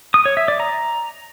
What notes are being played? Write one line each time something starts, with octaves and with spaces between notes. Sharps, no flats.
D#6
C#5
E5
D5
A#5